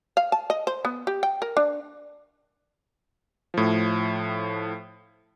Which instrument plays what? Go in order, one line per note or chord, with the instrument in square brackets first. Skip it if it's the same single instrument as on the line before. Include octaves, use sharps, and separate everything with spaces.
[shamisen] F5
A5
D#5
C5
B3
G4
G5
A#4
D4
[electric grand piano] A2 F3